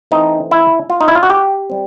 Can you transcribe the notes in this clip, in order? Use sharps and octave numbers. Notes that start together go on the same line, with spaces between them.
E3 A3 C4 D#4
E4
F4
D#4
E4
F4
F#4
G4
G3 C4